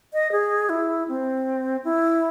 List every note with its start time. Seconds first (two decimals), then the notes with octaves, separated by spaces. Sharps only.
0.13 D#5
0.32 G#4
0.69 E4
1.08 C4
1.84 E4